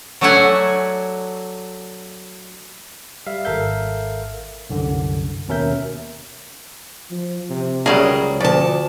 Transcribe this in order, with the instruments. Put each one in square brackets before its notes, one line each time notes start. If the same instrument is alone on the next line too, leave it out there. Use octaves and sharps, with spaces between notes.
[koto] F#3 A3 D4 E5 F#5 G#5
[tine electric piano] G3 E5 F5
G#1 A4 A#4 E5 F5 G6
C2 F#2 D3
D#2 B2 C#4 A#4 E5 G6
[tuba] F3
C3
[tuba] C#2 [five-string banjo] F#3 G3 A#4 [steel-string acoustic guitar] G#4
[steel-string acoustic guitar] D2 A5 [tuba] F3 [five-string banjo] D5